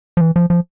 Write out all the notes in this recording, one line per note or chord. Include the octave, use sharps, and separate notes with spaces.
F3
E3
F3
F3